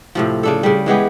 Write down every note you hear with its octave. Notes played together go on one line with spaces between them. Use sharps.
A2 C3 F3
C#3 D4 A4
C#3 G3
E3 G#3 B3 G4